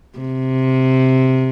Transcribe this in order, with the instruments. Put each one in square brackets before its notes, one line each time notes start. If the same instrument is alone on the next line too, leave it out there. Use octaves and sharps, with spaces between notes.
[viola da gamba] C3